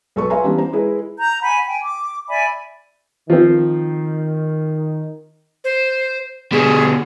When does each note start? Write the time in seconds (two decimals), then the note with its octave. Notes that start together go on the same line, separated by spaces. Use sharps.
0.16 B1 A4 B4 C#6
0.30 B4 E5 F5 G#5 A#5 C6
0.44 E3 G3 B3 C#4 D4
0.58 C5 A#5
0.73 G#3 E4 G#4 B4
1.18 A#5 G6
1.42 F#5 G#5 B5
1.66 G5 G#5
1.83 D6
2.28 D5 E5 G#5 B5
3.30 D#3 F3 C4
5.64 C5
6.52 B2 D3 G#4